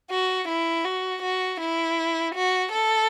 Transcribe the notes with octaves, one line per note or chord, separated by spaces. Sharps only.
F#4
E4
F#4
F#4
E4
F#4
A4